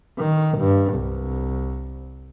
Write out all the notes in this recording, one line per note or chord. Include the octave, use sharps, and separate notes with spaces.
D#3
G2
C2